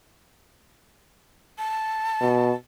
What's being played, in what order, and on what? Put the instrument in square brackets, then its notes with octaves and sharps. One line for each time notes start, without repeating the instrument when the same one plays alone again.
[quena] A5
[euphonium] B2